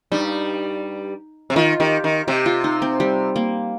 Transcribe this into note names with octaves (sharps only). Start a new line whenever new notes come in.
G2 G3 D#4
C3
D#3 F4
D#3 G4
D#3
C3 G4
F4
D#4
C4
G3
A#3